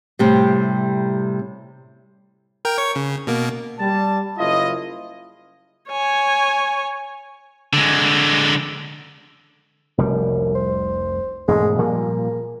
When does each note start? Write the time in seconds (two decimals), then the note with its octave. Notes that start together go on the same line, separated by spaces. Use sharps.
0.19 A2 C3 G3
2.65 A#4 G5
2.78 C#5 C#6
2.95 C#3
3.27 B2 A#3
3.80 G3 A5
4.38 F#1 E4 F4 D#5
5.90 C#5 G#5
7.73 D3 G#3
9.98 F1 C2 F#2 G3
10.55 C5
11.48 E1 G#2 G#3 A3
11.79 A#2 F3 G3 A#3